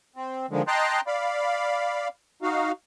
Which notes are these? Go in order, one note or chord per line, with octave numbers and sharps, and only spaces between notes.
C4
D3 D#3 F3 G#3
D#5 G5 A5 A#5 C6 F#6
D5 F5 B5
D#4 F#4 F5